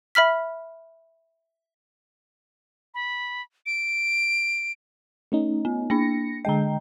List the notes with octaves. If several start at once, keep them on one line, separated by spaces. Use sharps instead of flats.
E5 B5 F6 B6
B5
D7
A3 C#4 D#4
B3
A#3 D4 A#6 C#7
D3 G#3 D#5 G5 A#5